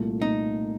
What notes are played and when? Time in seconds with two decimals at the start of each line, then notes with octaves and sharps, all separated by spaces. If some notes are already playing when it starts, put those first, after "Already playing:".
Already playing: C2 A#2 A3
0.21 A#2 A3 D#4